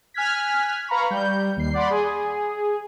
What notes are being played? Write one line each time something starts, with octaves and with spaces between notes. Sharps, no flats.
G#5 F6 F#6 G#6 B6
B4 F5 A#5 B5 C#6
G3 G6
D#2 C7
D5 F#5 B5 C6
G#4